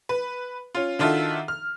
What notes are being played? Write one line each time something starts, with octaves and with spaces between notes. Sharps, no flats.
B4
C#4 F4
D#3 D4 F4 F#4 A4 E5
F6